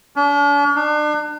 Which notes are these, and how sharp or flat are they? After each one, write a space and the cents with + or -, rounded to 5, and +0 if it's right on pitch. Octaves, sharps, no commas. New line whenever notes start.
D4 -45
D4 +35